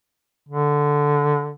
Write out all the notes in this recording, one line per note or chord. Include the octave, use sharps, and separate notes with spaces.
D3